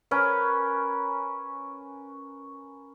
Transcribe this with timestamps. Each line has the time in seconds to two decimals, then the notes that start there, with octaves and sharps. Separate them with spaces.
0.11 C#4 A#4 B4